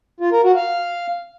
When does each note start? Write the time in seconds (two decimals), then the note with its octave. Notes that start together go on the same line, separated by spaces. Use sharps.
0.20 F4
0.32 A#4
0.44 F#4
0.56 F5